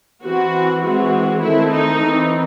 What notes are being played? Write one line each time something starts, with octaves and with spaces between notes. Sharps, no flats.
E3 C4 F#4
E3 G#3 C4 F#4
D#3 A3 C4 E4
D#4
E3 C4